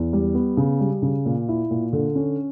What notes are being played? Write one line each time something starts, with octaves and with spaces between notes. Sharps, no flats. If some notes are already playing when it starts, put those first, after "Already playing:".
Already playing: E2
G3
B3
C#3
G3
C#3
A#2
E4
A#2
D3
C#4